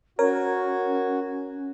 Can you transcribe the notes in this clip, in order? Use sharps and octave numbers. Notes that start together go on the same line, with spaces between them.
C#4 F#4 A#4 C#5